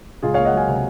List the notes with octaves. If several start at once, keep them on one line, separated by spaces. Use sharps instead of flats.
C#2 F4 G#4
A#3 C#5 F5
D#5 F#5
F#3 F5 G#5
C3